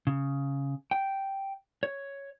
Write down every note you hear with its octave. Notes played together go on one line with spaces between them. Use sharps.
C#3
G5
C#5